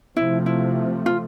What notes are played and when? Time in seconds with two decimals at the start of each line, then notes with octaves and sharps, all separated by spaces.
0.16 C3 F3 A3 E4
0.46 E4
1.06 F4